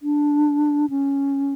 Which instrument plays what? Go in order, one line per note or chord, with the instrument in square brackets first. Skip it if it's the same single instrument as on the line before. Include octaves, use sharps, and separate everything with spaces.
[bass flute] D4
C#4